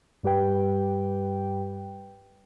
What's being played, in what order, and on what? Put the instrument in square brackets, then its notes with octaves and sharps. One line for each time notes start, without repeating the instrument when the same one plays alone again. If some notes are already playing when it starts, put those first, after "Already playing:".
[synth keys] G2 G3 G4 B4 G5